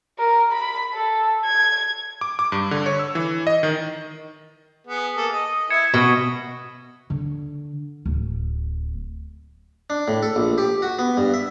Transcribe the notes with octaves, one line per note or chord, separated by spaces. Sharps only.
A#4
B5
A4
G#6
D6
D6
G2
D3
C#5
E6
E3
D#5
D#3
B3 G#4
A#3 G#4 A4
D#5
E4 G#6 C#7 E7
B2 D#5
D3
D1
D4
A2
A4
A#1
G4
F#4
B3
G2
E5